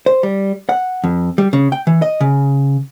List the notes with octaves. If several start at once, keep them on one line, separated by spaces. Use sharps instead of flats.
C5
G3
F#5
F2
G3
C#3
G5
E3
D#5
C#3